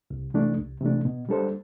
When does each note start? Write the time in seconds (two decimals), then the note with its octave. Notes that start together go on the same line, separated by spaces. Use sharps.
0.10 C2
0.34 C3 E3 A3 D4
0.58 C2
0.81 C3 E3 A3 D4
1.05 B2
1.29 G3 D4 A4 C5